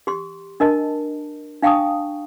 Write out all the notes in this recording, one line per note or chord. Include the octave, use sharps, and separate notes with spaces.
G4 C6
D4 A#4 D#5 A5
D4 F5 G5 A5 C#6 D#6